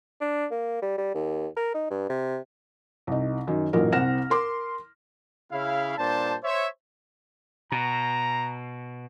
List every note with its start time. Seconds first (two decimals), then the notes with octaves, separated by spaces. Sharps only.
0.21 D4
0.51 A#3
0.82 G3
0.98 G3
1.15 D#2
1.57 A#4
1.74 D#4
1.90 G2
2.09 C3
3.07 C2 D#4
3.47 F#2 D#3
3.73 A1 F#2 A#2 F#3 D#4 A#4
3.93 C2 C4 F#5 F6 A#6 E7
4.30 A#4 C6 D6
5.52 C#3 E4 F5
5.98 G2 A#2 D4 G4 C5 A5
6.44 C5 C#5 E5
7.72 B2 A#5